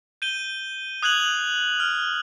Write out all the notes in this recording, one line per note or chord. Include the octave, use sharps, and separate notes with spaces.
G6 D#7 G7
D#6 F#6 G#6 F7 F#7
F6